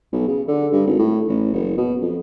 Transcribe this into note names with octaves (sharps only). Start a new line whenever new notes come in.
B1
C#3
D3
G2
G#1
A2
A1
F#1
B2
F2